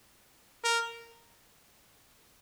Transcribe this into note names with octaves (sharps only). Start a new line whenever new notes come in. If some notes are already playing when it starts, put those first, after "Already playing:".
A#4